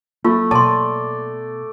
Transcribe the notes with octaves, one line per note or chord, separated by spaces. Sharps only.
F#3 A3 A#3 F4
B2 D5 A5 C6